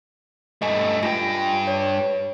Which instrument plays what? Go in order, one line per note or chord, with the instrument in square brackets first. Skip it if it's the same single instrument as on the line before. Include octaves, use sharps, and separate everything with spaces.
[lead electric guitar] G2 A3 [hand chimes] D#5 G#5
[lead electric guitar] G2 G5 [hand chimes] F4 G#5 A#6
[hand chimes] C#5